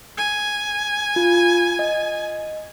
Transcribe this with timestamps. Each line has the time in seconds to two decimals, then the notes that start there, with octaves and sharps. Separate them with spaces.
0.18 G#5
1.16 F4
1.79 D#5